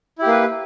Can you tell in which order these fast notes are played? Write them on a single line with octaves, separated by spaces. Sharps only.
E4 G4 A#3 B4